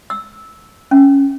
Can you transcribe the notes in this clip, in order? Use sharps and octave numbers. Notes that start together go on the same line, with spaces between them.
E6
C#4